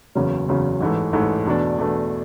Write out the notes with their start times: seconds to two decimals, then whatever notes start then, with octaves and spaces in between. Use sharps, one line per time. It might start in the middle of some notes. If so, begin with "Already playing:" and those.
0.15 F#1 E2 C#3 F#3 C#4
0.48 F#1 E2 C#3 F#3 C#4
0.80 A1 G#2 E3 A3
1.13 A1 G#2 E3 A3
1.46 E2 B2 A3 D4
1.78 E2 B2 A3 D4